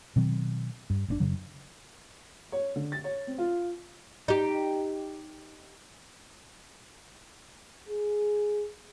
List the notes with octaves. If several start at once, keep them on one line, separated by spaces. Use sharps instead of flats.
B2 D#3 F#3 C4
G2
F#1 A#2 D4
F#2 C#3 F#3
C#5
D3
A6
C#5
C4
F4
D#4 G4
G#4